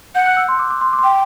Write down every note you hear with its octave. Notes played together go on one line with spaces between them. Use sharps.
F#5 G6
F#6
E6
C6
D6
D6
C6
D6
C6
G5 D6